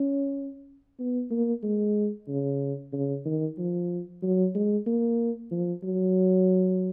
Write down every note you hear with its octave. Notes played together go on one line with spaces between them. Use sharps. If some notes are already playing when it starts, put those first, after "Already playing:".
Already playing: C#4
B3
A#3
G#3
C#3
C#3
D#3
F3
F#3
G#3
A#3
F3
F#3